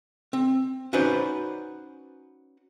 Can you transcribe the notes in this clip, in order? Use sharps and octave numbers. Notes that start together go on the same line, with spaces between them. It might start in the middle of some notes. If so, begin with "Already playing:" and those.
C4
C#4 D#4 F#4 B4 C5 D5